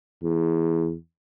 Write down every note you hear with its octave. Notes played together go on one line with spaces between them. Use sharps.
E2